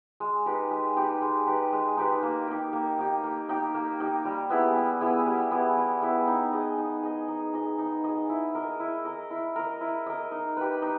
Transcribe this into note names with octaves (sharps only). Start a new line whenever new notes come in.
G#3
D#4 G4 B4
G#3
D#4 G4 B4
G#3
D#4 G4 B4
G#3
D#4 G4 B4
A#3
D#4 G4
A#3
D#4 G4
A#3
D#4 G4
A#3
D#4 G4
G3
B3 E4 G#4
G3
B3 E4 G#4
G3
B3 E4 G#4
G3
B3 E4 G#4
D#4
G#4 D#5
D#4
G#4 D#5
D#4
G#4 D#5
D#4
G#4 D#5
E4
A#4 D#5
E4
A#4 D#5
E4
A#4 D#5
E4
A#4 D#5
D#4
G4 B4
D#4